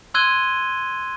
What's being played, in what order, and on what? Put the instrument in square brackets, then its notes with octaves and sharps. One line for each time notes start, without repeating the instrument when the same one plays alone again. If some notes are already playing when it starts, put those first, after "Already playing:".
[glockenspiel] C6 E6 F#6 G#6 D#7 G7